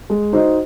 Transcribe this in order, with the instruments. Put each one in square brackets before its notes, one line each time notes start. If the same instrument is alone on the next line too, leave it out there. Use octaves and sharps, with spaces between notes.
[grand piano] G#3
D#4 F#4 C5 D#5